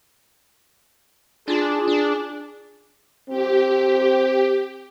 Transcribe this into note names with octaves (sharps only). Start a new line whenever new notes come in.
D4 F4 G#4
D4
C4 G4